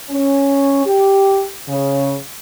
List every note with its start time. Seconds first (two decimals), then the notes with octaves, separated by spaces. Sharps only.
0.11 C#4
0.86 G4
1.69 C#3